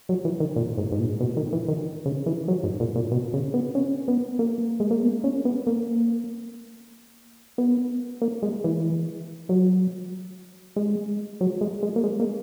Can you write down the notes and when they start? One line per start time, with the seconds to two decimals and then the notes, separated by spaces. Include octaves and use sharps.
0.09 F#3
0.25 E3
0.40 D#3
0.56 A#2
0.78 G#2
0.92 G#2
0.99 A#2
1.20 B2
1.37 D#3
1.53 E3
1.68 D#3
2.06 C#3
2.26 E3
2.48 F#3
2.63 G#2
2.80 A#2
2.96 A#2
3.12 B2
3.33 C#3
3.54 B3
3.75 C#4
4.08 B3
4.39 A#3
4.80 G#3
4.91 A#3
5.03 B3
5.24 C#4
5.45 B3
5.67 A#3
7.58 B3
8.22 A#3
8.43 G#3
8.64 E3
9.49 F#3
10.76 G#3
11.41 F#3
11.61 G#3
11.83 G#3
11.96 A#3
12.04 G#3
12.20 A#3